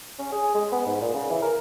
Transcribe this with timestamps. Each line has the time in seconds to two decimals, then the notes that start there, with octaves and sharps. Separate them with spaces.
0.19 C#4
0.32 G#4
0.55 G#3
0.72 B3
0.86 G#2
1.01 A#2
1.14 C#3
1.30 E3
1.42 A#4